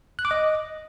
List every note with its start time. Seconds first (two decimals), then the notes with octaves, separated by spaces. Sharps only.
0.19 F#6
0.25 D6
0.31 D#5